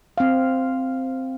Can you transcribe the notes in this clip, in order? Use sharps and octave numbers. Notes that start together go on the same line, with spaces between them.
C4 F5